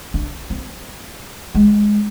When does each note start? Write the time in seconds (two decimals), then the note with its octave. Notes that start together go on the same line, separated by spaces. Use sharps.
0.14 D4
0.50 C4
1.55 G#3